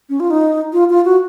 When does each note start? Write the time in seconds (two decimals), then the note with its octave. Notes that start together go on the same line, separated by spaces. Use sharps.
0.09 C#4
0.20 F4
0.31 D#4
0.73 F4
0.90 F4
1.05 F#4